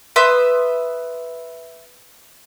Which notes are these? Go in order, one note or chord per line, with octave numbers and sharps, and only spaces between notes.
B4 E5 C6 D#6